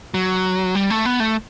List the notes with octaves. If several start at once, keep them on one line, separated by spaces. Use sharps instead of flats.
F#3
G3
A3
B3
A3